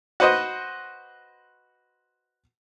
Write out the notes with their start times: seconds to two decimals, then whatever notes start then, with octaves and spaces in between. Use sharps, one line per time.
0.20 F#4 B4 C5 D#5